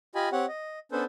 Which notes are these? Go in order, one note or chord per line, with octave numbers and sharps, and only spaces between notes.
F4 G4 D#5 G#5 B5
C4 G4 C#5 F#5
D#5
B3 C#4 D4 A4 B4 C5